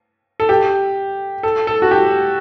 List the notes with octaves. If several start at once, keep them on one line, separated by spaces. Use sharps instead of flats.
A4
G4
A4
A4
F#4
G4